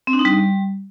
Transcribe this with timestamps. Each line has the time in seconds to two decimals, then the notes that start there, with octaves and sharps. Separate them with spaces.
0.07 C4
0.13 D4
0.19 D#4
0.25 G3